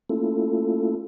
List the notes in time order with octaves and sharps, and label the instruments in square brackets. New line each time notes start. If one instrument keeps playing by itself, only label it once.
[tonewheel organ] A3 A#3 C#4 E4 F4 A4